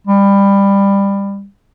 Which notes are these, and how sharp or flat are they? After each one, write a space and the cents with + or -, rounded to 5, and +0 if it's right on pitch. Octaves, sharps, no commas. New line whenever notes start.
G3 +20